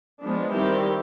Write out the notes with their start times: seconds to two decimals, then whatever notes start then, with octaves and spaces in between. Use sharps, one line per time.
0.23 F3 G#3 B3 D4
0.52 D#3 G3 C4 E4 G4